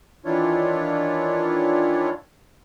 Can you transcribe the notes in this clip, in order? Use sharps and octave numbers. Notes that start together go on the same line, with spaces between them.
D#3 E3 D4 E4 F4 C#5